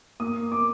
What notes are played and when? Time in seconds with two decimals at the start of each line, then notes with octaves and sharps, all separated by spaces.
0.20 A#3 D#6
0.52 D6